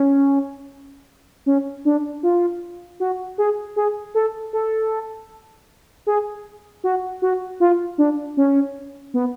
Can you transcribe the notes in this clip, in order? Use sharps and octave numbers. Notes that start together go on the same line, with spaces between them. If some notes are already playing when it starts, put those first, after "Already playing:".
Already playing: C#4
C#4
D4
F4
F#4
G#4
G#4
A4
A4
G#4
F#4
F#4
F4
D4
C#4
B3